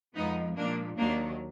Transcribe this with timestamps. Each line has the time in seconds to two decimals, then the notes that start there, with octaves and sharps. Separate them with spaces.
0.15 F2 F3 G#3 B3 D#4
0.57 A#2 F3 G#3 A#3 D4
0.97 D#2 D#3 F#3 A#3 D4